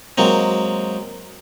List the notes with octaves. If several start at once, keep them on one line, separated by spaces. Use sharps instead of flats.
F#3 G#3 A#3 C4